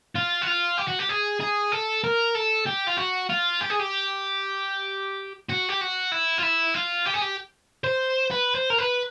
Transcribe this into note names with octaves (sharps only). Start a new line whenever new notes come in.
F4
F#4
F4
G4
F#4
G4
G#4
G#4
A4
A#4
A4
G4
F4
F#4
F4
G4
G#4
G4
F#4
G4
F#4
E4
F4
E4
F4
G4
G#4
G4
C5
B4
C5
A#4
B4